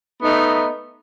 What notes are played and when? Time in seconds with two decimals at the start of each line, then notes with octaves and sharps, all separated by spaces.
0.22 A3 B3 D#4